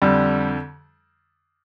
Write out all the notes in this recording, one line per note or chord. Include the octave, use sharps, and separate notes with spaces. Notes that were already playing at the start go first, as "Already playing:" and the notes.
F2 D3 G3